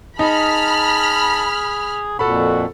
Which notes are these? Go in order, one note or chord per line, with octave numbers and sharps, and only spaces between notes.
D#4 G#4 A5 B5 F6
F2 A#2 F#4 A4 B5